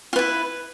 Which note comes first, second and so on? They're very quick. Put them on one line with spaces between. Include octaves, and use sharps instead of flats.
F4 B4 E4